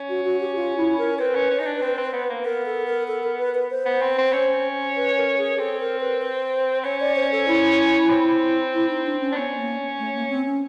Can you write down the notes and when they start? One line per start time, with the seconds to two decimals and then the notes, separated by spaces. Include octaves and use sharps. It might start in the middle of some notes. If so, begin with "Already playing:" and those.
Already playing: C#4
0.09 F#4
0.25 F#4
0.40 G4
0.55 F4
0.77 E4
0.98 A#4
1.19 C4 B4
1.35 C#4
1.51 C#4
1.59 D#4
1.66 D4
1.81 C4
1.98 C4
2.13 B3
2.29 A#3
2.45 B3 A#4
2.66 A4
2.87 A#4
3.07 A4
3.23 A#4
3.39 B4
3.54 B4
3.70 C5
3.85 B3
4.02 C4
4.18 C4
4.32 C#4
4.96 B4
5.17 A#4
5.38 G#4
5.59 C4 A4
5.80 A#4
6.00 B4
6.22 C5
6.84 C#4 C#5
7.00 D5
7.16 C5
7.32 A4
7.48 E4
8.10 C4
8.73 E4
8.89 D#4
9.04 D4
9.20 C#4
9.32 D4
9.35 B3 C#4
9.57 A#3
9.99 A3
10.14 A#3
10.30 C4
10.46 C#4